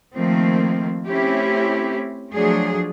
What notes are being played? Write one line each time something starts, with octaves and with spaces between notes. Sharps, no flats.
D#3 F3 A3 A#3 C4
A3 C4 C#4 E4 G4
F3 F#3 A3 D4 G#4